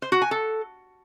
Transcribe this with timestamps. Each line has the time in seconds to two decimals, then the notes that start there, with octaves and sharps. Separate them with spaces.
0.02 C5
0.12 F#4
0.22 G#5
0.31 A4